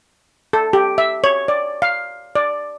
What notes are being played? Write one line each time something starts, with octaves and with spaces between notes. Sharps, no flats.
A4
G4
E5
C#5
D5
F5
D5